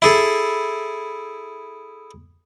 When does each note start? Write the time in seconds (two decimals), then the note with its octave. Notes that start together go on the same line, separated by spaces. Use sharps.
0.02 E4 G#4 A4